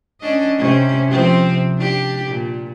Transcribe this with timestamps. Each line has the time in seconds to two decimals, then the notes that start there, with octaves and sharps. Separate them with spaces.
0.21 C#4 D4 D#5
0.58 C3 C#4
1.08 C3 F3 C4
1.79 D4 G4
2.27 A#2